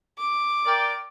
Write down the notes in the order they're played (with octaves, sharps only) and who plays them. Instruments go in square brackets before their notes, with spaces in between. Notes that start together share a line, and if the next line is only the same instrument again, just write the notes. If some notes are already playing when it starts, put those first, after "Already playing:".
[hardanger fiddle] D6
[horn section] A#4 D5 G5